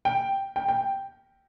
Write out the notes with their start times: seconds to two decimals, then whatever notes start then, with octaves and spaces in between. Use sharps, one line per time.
0.05 G5
0.56 G5
0.69 G5